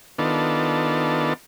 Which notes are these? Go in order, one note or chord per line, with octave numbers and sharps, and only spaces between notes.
D#3 B3 D4 F4 A4